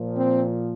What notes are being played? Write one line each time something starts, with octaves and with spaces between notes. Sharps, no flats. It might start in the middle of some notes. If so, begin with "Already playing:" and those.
Already playing: A#2 F3
C4